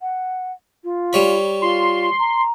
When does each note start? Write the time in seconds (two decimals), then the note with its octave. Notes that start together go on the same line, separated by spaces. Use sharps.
0.01 F#5
0.84 F4
1.13 G3 C#5 B5
1.62 F4 C6
2.19 A#5